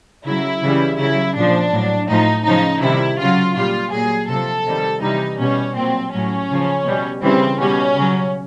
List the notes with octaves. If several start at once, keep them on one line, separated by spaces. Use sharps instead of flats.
C#3 F#3 E4
C#3 E3 G3
C#3 F#3 E4
A#2 F3 D4
A2 F#3
A2 F3 D#4
C#3 F3 D#4
C3 D#3 G3 E4
C#3 F#3 F4
A#2 G3 F4
A#2 F#3 G#4
C3 F3 A4
C3 D#3 G3
C3 E3 G3 D#4
B2 G3 C#4
A#2 F#3 C4
A2 F#3 C#4
C#3 F3
B2 G3
C#3 E3 G3 C4
B2 G3 C#4
C#3 F#3